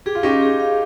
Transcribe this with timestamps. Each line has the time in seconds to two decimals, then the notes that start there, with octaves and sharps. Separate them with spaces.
0.06 G4 G#4
0.15 F4
0.23 C#4 D#4 G4
0.42 G#4
0.60 F5